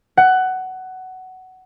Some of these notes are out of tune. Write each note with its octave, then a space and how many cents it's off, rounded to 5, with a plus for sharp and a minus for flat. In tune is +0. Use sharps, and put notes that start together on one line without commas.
F#5 +15